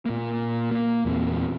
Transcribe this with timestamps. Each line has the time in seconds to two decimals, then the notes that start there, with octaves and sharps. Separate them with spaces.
0.06 A#2 A#3
0.71 A#3
1.05 E2 A#2 A3 C4